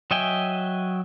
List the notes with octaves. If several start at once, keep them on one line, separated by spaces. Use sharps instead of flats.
F#3 D#5 E5 G5 G#5